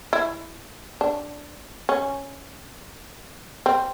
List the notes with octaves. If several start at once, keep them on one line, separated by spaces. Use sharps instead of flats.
E4
D4
C#4
C4